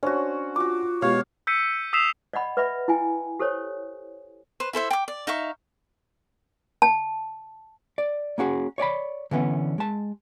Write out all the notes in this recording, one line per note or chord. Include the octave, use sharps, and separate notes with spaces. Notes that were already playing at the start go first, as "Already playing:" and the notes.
C#4 D4 F#4 C5 C#5
F4 F#4 D6
B2 G#3 G4 C#5 F5
E6 G6 B6 C#7 D#7
D#6 E6 B6 C7 E7 F7
D5 D#5 F#5 B5
B4 D5 E5 F#5 B5
E4 G5 G#5
G4 A4 C5 C#5
B4 C5
E4 A4 C5 E5
G5 D6
D5
D#4 E5 F5 C#6
A5
D5
A#3 C#4 F#4 G#4
C#5 D5 G#5 B5
D3 E3 B3 C#4
G#3 A5